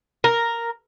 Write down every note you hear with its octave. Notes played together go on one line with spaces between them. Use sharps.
A#4